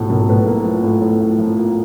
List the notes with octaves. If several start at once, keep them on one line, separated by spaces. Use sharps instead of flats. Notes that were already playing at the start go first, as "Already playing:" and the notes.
Already playing: B1 A2 F3
B1 A#4
A2 B4
A#3
F3
A2
A2
F3
F3
A#3